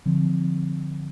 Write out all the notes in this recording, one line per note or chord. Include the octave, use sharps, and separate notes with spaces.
D3 F3 C4